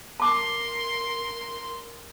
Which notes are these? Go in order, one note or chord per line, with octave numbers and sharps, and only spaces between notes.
A#4 A5 C6 D6